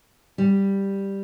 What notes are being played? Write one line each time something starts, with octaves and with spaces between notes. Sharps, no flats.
G3